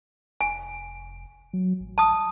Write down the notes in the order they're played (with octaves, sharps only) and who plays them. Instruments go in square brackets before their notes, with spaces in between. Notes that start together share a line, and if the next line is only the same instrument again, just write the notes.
[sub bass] F1 [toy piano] G#5
[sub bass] F#3
A1
[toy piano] A5 D#6